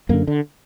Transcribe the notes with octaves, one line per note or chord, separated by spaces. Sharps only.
F#2 D3 A#3
D3